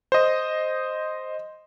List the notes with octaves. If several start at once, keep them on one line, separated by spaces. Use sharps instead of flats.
C5 D#5